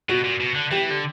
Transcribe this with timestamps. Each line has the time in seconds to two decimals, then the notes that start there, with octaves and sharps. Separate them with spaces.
0.09 B2 F#4
0.24 A#2
0.41 B2
0.55 D3
0.71 E3 G4
0.90 D3